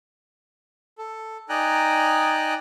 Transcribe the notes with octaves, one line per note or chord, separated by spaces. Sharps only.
A4
D#4 D5 G5 G#5 A#5 F#6